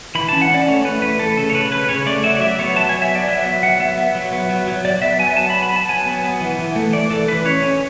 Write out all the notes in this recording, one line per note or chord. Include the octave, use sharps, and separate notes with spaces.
E3 B5
C#4 A5
F#5
C#4 D5
A3 C#5
A3 B4
E3 B4
A3 A4
C#3 A4
C#5
C#3 B4
C#4 B4
C#3 C#5
A3 D5
F#3 E5
D5
F#3 E5
B3 C#5
F#3 A5
B3 G#5
E5
B3 D5
F#3 E5
B3 E5
F#3 F#5
B3 E5
B3
F#3
B3
F#3
F#3
F#3 D5
B3 E5
F#3 G#5
B3 A5
B5
B3
B5
B3 A5
F#3 G#5
B3
B3
E3
E3
A3
E3 D5
E3 A4
E3 B4
C#4 C#5
C#4